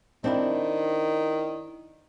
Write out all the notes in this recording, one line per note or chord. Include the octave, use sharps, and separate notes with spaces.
D#3 C4 D4 E4